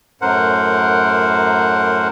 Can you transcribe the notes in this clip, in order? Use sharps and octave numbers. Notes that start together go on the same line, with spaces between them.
F#2 A2 A#4 C5 F#5